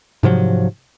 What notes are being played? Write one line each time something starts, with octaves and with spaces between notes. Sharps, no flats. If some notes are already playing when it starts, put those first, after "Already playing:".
G#2 C3 F3 F#3